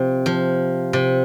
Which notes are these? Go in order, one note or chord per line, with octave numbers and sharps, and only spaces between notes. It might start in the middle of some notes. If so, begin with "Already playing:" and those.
Already playing: C3 F3
F3
C3